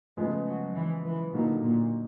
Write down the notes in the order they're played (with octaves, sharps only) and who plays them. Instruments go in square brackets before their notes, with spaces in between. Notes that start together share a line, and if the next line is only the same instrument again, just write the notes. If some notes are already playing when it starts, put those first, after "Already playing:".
[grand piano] C#3 F3 G#3 B3 [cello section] A3
[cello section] F#3
E3
E3
[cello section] A#2 [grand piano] D3 F#3 A#3 D#4 F#4
[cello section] A#2